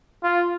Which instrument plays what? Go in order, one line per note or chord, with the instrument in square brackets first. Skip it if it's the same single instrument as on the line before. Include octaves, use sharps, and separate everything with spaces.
[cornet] F4